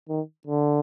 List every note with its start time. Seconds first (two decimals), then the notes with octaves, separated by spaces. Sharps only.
0.09 D#3
0.47 D3